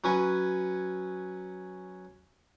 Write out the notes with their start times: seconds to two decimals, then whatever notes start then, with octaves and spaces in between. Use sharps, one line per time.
0.04 F#3 C#4 F#4 B4 G#5